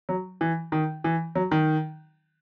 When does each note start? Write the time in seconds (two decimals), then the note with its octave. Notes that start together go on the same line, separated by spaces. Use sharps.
0.09 F#3
0.41 E3
0.72 D#3
1.04 E3
1.35 F#3
1.51 D#3